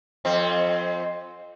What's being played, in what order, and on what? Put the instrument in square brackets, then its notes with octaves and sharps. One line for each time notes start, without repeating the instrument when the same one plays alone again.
[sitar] F2 C4